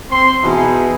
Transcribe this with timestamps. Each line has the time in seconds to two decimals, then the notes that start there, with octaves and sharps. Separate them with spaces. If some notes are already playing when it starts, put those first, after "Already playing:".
0.11 C4 C6
0.44 B2 E3 D#4 E4 G#4